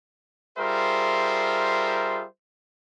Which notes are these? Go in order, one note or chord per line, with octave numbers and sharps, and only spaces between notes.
G3 F4 G#4 A#4 C5 E5